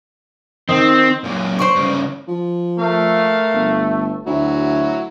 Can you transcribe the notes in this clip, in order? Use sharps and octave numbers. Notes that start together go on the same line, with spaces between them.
D#3 C4 D#6
F#2 A#2
C5 D5 C#6
G2 C#3
F3
A3 A#4 F5
G1
D2 F#3 E4 F#4